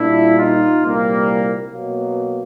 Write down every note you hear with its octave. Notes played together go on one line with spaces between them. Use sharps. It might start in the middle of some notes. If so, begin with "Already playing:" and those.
Already playing: A#2 G3 A#3 D4 E4
D#4 F4
C2 A#2 G3 A#3
B2 F#3 A#3